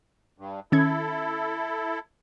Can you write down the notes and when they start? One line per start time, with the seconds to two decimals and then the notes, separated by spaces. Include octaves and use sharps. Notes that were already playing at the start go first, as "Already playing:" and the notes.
0.38 G2
0.72 D#3 C#4 E4 A4 G#6